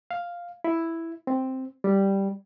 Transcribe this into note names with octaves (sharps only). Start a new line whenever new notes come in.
F5
E4
C4
G3